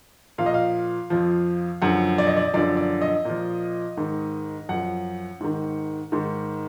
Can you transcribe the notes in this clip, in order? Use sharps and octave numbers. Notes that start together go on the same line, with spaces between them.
A#2 F3 F5
D#5
F5
F2 F3
F#2 D3 F3 F#5
D5
D#5
D5
D#5
F#2 D3 F3 D5
D5
D#5
A#2 F3
G#2 D#3
F#2 F3 F#5
G#2 D#3
G#2 D#3